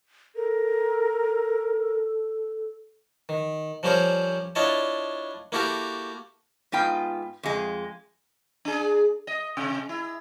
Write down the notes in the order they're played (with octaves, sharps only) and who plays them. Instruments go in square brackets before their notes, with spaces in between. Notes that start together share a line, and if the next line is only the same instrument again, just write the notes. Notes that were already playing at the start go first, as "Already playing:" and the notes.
[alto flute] A4 [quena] A#4
[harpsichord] D#3
F3 G3 C#4 A#4 C5 C#5
D4 E4 F4 C#5 D#5 A5
A#3 E4 F#4 G4 A4 A#4
[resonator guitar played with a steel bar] G#2 B3 F4 G5
F2 G#3
[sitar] D4 G#4
D#5
C3
E4